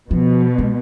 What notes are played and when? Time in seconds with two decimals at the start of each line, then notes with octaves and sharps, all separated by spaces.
0.11 B2 F3
0.58 G#3